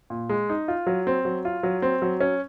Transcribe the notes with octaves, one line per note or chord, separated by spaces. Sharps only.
A#2
G#3
D#4
F4
F#3
C4
F#3
F4
F#3
C4
F#3
C#4